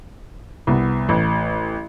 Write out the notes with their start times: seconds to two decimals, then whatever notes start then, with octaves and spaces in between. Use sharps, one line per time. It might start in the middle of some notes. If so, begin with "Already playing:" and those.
0.67 C2 B3
1.09 A1